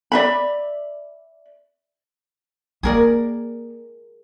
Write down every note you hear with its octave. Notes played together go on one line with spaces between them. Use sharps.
D5 E5 B5
A#3 G#4 A#4 D5